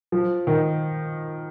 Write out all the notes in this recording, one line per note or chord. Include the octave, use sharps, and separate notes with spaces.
F3
D#3